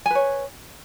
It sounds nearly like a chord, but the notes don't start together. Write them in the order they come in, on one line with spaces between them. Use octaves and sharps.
G#5 B4 C#5